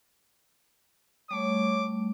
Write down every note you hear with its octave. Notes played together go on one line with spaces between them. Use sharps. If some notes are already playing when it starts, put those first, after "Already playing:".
G3 A3 C#5 D6